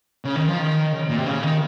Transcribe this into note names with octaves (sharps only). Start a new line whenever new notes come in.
C#3
D#3
F3
D#3
C#3
A#2
C3
C#3
D#3